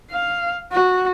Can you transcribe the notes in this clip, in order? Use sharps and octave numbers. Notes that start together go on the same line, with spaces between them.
F5
F#4